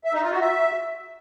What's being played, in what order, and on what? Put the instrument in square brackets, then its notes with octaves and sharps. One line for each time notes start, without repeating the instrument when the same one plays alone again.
[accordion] E5
D#4
F4
F#4
E5